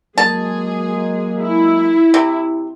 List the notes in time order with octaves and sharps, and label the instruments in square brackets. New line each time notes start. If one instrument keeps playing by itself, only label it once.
[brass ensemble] F#3 G#3 A#3 [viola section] G#4 [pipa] A5
[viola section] E4
[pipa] C3